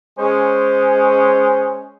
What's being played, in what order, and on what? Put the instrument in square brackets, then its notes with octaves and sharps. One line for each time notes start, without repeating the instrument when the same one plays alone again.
[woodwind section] G#3 C#4 [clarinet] C5